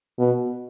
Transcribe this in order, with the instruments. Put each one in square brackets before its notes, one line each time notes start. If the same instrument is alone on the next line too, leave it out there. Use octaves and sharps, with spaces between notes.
[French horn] B2